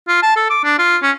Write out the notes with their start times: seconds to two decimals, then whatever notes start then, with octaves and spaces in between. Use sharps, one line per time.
0.08 F4
0.23 A5
0.37 A4
0.50 D6
0.64 D4
0.79 F4
1.02 C#4